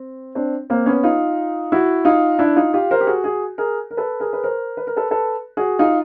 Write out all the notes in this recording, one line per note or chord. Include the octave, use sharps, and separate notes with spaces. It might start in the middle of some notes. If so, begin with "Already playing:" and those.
Already playing: C4
C4 D4
A#3 C4
B3 C#4
D#4 F4
E4 F#4
D#4 F4
D4 E4
D#4 F4
F4 G4
A#4 C5
G4
F#4 G#4
F#4 G#4
G#4 A#4
A#4
A4 B4
G#4 A#4
B4
A#4 C5
B4
A#4
A4 B4
A4 B4
F#4 G#4
D#4 F4